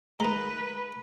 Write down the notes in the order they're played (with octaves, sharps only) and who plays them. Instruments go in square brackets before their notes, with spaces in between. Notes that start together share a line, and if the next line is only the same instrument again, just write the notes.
[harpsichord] D#3 G#3 [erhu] B4 [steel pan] A#5